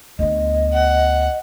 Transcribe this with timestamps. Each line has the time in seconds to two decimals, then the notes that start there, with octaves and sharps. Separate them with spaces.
0.19 D2 B3 D#5
0.73 F#5